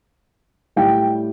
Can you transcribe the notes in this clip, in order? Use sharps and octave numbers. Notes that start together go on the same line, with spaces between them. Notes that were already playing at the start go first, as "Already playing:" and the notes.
A2 G3 G5